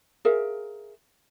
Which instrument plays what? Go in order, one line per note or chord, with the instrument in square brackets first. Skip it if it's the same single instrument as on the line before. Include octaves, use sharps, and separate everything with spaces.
[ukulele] G#4 A#4 E5 F5